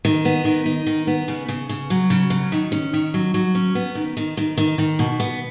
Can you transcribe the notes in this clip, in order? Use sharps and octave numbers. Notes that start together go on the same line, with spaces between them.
D#3
B3
D#3
D#4
D#3
B3
C#3
C#3
C#3
F#3
C#3
F#3
D#3
C#4
D#3
F#3
F#3
C#4
B3
D#3
D#3
D#3
D#3
D#3
B2
B3